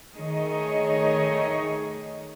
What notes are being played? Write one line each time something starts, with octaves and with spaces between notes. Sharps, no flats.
D#3 A3 D#4 G#4 C#5 D#5